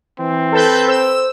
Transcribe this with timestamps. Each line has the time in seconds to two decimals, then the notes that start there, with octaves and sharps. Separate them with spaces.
0.20 E3 C4
0.52 A4 B4 G6
0.88 C5 E6